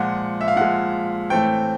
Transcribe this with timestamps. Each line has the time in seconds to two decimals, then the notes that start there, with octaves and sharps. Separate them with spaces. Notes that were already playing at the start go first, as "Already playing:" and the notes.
Already playing: A#2 F3 G#3 F#5
0.41 E5
0.48 F5
0.56 A#2 F3 G#3 F#5
1.30 A2 E3 A3 C4 G5